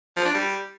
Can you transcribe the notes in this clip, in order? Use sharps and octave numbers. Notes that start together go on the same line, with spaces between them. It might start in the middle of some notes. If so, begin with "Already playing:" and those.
F3
D4
G3